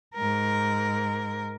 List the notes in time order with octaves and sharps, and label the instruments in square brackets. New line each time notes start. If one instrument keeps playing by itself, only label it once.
[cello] G#2 A#4